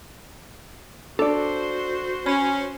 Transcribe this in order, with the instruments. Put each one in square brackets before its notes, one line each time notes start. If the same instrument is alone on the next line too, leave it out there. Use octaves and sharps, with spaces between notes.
[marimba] D4 [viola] F#4 C5 [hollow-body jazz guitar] A4 D5
[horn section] C#4 [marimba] B5